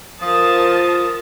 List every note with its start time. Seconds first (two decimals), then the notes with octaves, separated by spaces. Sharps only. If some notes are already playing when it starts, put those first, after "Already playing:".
0.21 F3 A#4 A5 D#6